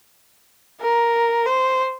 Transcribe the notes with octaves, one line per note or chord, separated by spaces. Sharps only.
A#4
C5